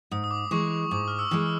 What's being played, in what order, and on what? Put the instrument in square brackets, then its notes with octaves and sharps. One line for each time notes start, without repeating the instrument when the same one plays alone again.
[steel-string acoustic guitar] G#2 [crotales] D#6
[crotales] D#6
D6
[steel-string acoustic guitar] E3 G#3 [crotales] C#6
[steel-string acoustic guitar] G#2 [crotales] D6
[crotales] F6
E6
[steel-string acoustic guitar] E3 G#3